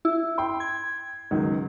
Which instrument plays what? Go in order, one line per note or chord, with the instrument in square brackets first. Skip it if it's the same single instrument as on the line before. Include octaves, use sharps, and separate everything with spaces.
[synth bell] E4
[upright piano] G5 C6
[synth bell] G#6
[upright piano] C#2 D#3 F#3